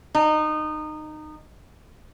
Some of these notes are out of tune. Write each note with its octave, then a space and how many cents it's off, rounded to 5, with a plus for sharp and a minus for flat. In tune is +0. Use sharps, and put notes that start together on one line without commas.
D#4 -20